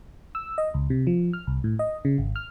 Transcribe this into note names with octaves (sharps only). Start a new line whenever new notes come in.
E6
D#5
C#2
C3
F3
F6
C2
A2
D#5
C#3
G#1
F6